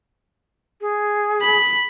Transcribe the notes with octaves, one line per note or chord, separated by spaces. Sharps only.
G#4
B5